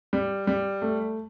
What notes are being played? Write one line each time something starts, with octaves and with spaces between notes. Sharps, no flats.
G3
G3
A3